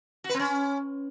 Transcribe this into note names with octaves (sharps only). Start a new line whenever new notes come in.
F#4
B4
C4
C#4